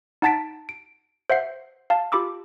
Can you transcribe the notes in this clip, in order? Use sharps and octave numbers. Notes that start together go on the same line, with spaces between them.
D#4 F#5 A5 A6 B6 D7
D7
C5 E5 F#5 C7
F5 A5
F4 G4 B5 D6 E6